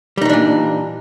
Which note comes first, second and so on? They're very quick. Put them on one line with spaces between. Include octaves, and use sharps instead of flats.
G3 D#4 E3 D4 A#2